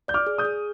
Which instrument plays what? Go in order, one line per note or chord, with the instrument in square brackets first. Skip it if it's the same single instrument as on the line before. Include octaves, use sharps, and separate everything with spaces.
[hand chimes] D5 [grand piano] G6
[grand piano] D6 F6
[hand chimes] G#4
[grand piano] D#6 G6
[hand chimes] G#4